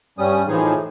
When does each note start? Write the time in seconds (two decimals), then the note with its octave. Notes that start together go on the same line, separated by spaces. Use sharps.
0.19 G2 G3 C#4 D#6
0.48 A2 E3 F3 D#4 G#4